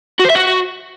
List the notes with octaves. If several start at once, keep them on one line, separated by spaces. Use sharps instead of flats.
F#4
C5
E5
F#4